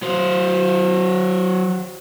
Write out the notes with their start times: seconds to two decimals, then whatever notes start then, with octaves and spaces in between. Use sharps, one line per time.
0.02 F#3 C5